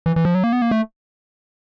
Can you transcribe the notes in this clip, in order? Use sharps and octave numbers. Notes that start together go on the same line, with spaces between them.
E3
E3
F3
F#3
A#3
B3
A#3
A3